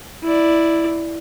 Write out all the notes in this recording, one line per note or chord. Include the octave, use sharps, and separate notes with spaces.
E4 D5